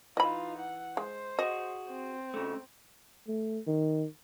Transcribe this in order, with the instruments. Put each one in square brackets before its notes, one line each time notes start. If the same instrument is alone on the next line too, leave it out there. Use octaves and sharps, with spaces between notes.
[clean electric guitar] E3 [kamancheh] D#4 F4 [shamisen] D#5 B5
[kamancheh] F#5
[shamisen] G#3 [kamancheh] C5
[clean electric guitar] F#4 G#4 [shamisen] D#5
[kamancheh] C4
[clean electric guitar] C#3 A3
[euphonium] A3
D#3